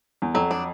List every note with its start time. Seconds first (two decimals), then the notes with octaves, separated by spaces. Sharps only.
0.22 E2
0.35 F2 F#3
0.51 D4